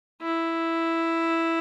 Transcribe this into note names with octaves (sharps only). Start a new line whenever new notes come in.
E4